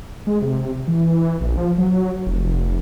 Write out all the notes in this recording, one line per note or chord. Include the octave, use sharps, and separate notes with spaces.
G#3
C3
E3
A#1
F3
F#3
F1